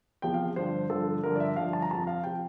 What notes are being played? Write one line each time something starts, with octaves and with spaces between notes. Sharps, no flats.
E2 C3 F3 G5
F5
G2 D3 F3 C5
G2 D3 F3 A4
G2 D3 F3 A#4
D5
E5
G2 D3 F3 F5
A5
A#5
F2 C3 F3 A5
F5
C3 F3 G5